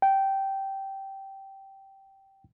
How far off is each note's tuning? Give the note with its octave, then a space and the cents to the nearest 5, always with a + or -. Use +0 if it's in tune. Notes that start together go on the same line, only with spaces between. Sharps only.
G5 -10